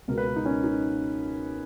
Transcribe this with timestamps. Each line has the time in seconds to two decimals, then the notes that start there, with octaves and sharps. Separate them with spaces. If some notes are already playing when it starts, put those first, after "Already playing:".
0.08 C#2 B2 A#3 A#4
0.18 B4
0.26 A#4
0.36 D#4
0.45 C#4
0.64 D#4